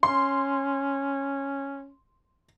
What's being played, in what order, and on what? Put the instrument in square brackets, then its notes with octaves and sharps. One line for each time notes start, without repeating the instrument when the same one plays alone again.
[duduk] C#4 [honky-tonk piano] C6